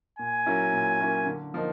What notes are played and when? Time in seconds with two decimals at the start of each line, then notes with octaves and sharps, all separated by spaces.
0.19 A#2 G#5
0.46 F#3 A#3 C#4 E4
0.73 A#2
1.00 F#3 A#3 C#4 E4
1.26 D3
1.54 F3 A#3 D#4